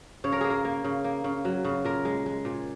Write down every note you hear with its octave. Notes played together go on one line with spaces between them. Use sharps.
C#3 C#5
A#4
A#3 G#4
A#4
A#3
C#3
A#3
C#3
F#3
C#3
A#2 A#4
G#3
G#3
A#2